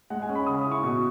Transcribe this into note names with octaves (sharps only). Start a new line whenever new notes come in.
G#3 F#5
G#5
C#4
B5
C#3 D#6
E4
C#6
B2